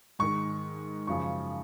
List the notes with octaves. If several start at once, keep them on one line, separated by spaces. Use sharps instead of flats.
G#2 D#3 C#6
F#2 C#3 F3 C#6